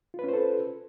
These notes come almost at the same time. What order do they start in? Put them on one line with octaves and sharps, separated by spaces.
F4 B4 C#4 C5 A4